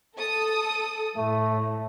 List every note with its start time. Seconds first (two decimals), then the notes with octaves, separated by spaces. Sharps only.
0.17 A4 D#6
1.16 A2 A3